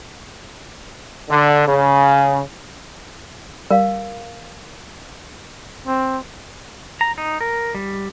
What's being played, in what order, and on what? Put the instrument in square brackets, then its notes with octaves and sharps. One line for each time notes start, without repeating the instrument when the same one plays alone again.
[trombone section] D3
C#3
[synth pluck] G3 [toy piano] A#4 F5
[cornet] C4
[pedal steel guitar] A#5
D#4
A#4
G3